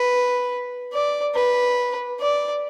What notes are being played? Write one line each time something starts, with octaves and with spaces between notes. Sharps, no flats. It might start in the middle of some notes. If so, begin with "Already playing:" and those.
Already playing: B4
D5
B4
D5